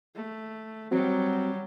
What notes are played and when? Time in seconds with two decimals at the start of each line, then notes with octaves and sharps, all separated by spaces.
0.16 A3
0.91 F#3 G3 C4 F#4